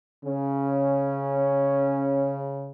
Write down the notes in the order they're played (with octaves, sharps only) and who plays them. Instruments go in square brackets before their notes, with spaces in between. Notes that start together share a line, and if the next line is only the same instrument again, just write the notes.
[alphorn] C#3 [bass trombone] C#4